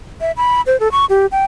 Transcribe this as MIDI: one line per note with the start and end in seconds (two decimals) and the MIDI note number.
0.21 0.32 76
0.37 0.61 83
0.67 0.79 72
0.80 0.91 69
0.92 1.05 85
1.10 1.26 67
1.32 1.45 79